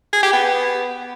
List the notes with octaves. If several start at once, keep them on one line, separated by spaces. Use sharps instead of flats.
G#4
G4
B3